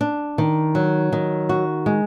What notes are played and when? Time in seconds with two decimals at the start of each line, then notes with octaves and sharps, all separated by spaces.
0.01 D4
0.38 D#3
0.75 F#3
1.12 D#3
1.49 F#4
1.86 G#3